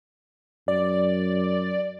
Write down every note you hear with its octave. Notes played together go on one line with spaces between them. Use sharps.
F#2 D5